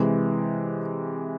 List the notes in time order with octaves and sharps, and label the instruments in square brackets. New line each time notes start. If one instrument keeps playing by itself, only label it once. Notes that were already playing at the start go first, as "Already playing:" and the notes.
Already playing: [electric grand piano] C3 E3 G#3